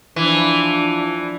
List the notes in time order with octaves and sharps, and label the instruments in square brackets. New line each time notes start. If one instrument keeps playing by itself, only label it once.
[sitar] E3 [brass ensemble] F3 D4